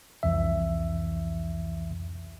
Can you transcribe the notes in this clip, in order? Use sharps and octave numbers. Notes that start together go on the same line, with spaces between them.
C2 F2 E3 E5